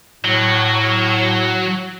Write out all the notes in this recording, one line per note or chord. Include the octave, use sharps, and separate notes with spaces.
A2 F#3